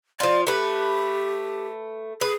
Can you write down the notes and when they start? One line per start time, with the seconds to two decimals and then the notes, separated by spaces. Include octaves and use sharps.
0.20 F3 F4 D5
0.47 A3 G4 B4
2.21 G#4 B4